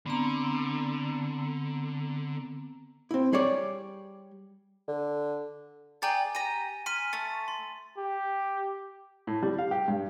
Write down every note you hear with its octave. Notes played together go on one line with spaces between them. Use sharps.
D3 B3 C4 A#5
C4 E4
G3 G#4 C#5 D5
D3
G#4 D5 G5 G#5 A#5 A6
G4 A#5 D#7
G#5 C6 F6 B6 D#7
A3 A6
C6
G4
A2
G3
F5
G4
G2